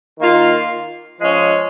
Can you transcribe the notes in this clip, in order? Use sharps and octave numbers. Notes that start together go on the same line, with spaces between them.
D#3 A#3 F4
F3 G#3 C#4